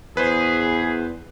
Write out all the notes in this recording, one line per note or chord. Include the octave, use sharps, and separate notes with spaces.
E2 G#4 B4 C5